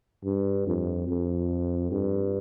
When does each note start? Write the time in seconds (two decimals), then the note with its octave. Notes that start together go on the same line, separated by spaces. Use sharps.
0.25 G2
0.67 F2
1.08 F2
1.91 G2